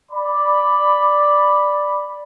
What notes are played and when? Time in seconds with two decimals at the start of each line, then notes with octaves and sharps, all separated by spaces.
0.12 D5 B5